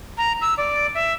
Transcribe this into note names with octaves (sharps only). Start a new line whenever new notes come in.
A#5
E6
D5
E5